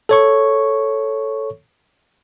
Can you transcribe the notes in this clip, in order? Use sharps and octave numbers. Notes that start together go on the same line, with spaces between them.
A4 C#5 C#6